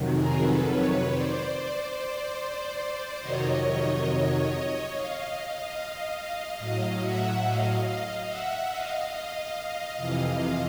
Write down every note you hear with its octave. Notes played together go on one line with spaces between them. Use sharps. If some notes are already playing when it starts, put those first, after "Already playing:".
Already playing: F2 C3 D#3 F#3
G#4 A#4
A4 B4
B4 C#5
C5 D5
F2 C3 D#3 F#3 C#5 D#5
D#5 F5
A2 F#3 D#5 F5
E5 F#5
D#5 F5
E5 F#5
D#5 F5
D#5 F5
D#5 F5
F2 C3 E3